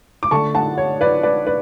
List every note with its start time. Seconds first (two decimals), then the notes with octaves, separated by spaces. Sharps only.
0.23 D6
0.31 D3 A3 A5 C#6
0.55 F#5 A5
0.78 C#5
1.01 B4 D5
1.23 B4 D5
1.47 B4 D5